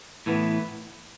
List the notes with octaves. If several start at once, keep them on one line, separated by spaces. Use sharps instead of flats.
A2 E3 B3